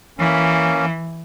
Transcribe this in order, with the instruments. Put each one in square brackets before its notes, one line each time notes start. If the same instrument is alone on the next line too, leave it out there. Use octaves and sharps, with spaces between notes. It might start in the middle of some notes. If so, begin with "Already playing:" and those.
[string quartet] E3 [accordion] A#3 C#4